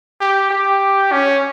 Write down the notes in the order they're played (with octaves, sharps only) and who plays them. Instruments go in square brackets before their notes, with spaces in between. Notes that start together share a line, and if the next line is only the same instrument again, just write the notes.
[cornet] G4
G4
C#4